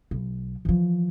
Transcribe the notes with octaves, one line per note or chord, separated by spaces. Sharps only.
B1
E3 F3